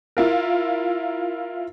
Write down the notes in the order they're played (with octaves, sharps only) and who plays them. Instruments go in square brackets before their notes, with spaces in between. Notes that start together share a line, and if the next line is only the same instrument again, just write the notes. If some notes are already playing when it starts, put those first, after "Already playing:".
[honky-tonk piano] E4 F4 A#4